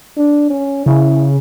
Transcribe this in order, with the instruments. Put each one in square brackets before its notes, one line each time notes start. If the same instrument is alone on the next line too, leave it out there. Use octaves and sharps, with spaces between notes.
[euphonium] D4
C#4
[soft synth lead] C#3 [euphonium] E4